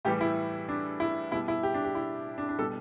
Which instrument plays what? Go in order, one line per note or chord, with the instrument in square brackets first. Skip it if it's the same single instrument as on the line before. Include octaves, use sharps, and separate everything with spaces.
[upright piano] A2 E3 G3 G4
E4
D4
E4
B2 G3 E4
E4
G4
D4
G4
E4
D4
D4
B2 G3 A4